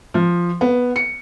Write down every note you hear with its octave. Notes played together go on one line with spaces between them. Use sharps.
F3
B3
C#7